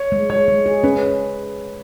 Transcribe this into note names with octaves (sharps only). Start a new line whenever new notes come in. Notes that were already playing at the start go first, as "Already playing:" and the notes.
Already playing: C#5
G#3
G#3 C#5
G#3
G#4
C#4 B4